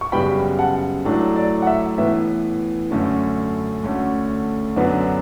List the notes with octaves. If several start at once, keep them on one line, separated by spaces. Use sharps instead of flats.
C#6
F#2 C#3 G3 B3 G5 B5
F#5 A5
A2 F#3 A3 D4
D5
F#5
E5
A2 E3 B3 E5
F#2 D3 A3 C#4
D2 D3 A3 C#4
F#2 D3 F#3 B3 D4